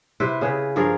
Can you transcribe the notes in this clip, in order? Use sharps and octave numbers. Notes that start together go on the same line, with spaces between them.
C3 E4 B4 C5
C#3 G#4 B4
G2 F3 G#4 A#4